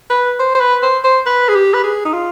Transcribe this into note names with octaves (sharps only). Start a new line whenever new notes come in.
B4
C5
C5
B4
C5
C5
B4
G#4
G4
B4
G#4
D#4
F4